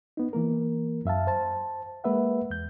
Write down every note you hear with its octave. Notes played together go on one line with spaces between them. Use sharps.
B3 D#4
E3 A#3 A#4
F#2 E5 F5 A5
C5 A5
G#3 A#3 B4 E5 F#5
E2 G6